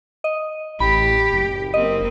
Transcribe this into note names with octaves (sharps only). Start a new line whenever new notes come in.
D#5
A1 G4 B5
F#1
A#3 C4 D#5